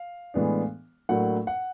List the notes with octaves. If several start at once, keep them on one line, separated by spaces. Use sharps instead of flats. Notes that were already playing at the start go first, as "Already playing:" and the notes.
Already playing: F5
A2 E3 G#3 B3 D4
A2 F#3 A#3 D4 F#5
F#5